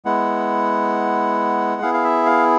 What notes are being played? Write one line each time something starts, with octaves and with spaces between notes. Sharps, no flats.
G#3 B3 E4 F#5
B3 E4 G#4 F5
F5
E5
F5